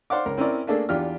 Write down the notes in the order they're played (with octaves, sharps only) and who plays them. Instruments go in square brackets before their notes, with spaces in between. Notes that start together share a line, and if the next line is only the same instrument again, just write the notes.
[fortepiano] C5 D5 F5 F#5 D6
C#2 A#4
C4 C#4 E4 A#4 D5
A3 A#3 D4 G#4 A4
E2 D4 F4 G4 F6